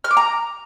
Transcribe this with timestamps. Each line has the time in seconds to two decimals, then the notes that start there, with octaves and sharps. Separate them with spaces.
0.04 F6
0.11 D6
0.17 A#5